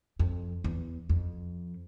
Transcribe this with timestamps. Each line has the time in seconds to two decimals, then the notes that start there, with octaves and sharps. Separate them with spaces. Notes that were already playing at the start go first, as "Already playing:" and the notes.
0.19 F2
0.64 E2
1.09 F2